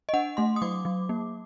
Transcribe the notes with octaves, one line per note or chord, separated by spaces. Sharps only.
D#5
D4 F#5
A3 C6
D#6
F#3 D6
F#3
A#3